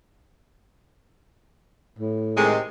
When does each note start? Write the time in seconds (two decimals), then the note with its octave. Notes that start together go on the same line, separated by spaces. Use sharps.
1.99 A2
2.37 C3 D#3 G#3